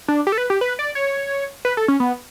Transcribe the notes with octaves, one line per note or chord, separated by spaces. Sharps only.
D4
G4
A4
B4
G4
B4
D5
C#5
B4
A4
C#4
B3